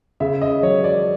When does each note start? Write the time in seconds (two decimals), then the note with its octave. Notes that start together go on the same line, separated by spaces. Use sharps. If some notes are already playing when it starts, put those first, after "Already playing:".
0.20 C#3 E5
0.42 D#5
0.63 F#3 C#5
0.84 D5